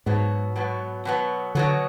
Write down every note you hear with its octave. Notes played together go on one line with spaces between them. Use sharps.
G#2 B2 F#3 B3
B2 F#3 B3
B2 F#3 B3
B2 D3 F#3 B3